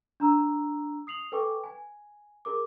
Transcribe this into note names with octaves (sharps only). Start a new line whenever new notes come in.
D4 A#5 E6
D#6 C7 F7 F#7
A4 B4 G5 G#5 C#6 D6
G#5
G#4 A#4 D6